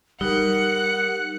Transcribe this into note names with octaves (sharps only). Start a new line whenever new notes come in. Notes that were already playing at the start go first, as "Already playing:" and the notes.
G3 D#4 A#4 F#5 F#6